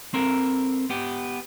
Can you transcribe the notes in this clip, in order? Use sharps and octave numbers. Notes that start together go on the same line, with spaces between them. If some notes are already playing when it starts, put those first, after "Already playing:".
C4 A4 A#4
B3 G4